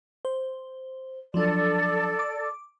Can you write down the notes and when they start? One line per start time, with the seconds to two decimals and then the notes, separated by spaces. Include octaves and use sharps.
0.25 C5
1.34 F3 F#3 D4 A4 D5
2.19 D6